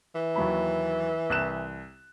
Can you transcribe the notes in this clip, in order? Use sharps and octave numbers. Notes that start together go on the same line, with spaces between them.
E3
D#2 F#3 B5
C2 F#6 E7